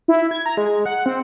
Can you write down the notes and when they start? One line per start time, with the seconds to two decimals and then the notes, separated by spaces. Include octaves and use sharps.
0.08 E4
0.31 G#6
0.46 A#5
0.57 G#3
0.86 F#5
1.06 C4